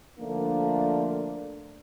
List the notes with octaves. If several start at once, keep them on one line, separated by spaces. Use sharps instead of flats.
D3 F3 A3 A#3 D4